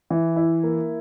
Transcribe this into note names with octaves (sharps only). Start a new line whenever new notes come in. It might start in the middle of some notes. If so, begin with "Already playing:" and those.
E3
E4
A#3